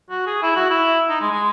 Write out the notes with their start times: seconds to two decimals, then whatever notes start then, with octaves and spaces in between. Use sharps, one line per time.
0.10 F#4
0.26 G#4
0.42 E4
0.56 F#4
0.70 E4
1.09 D#4
1.21 G#3
1.31 G#3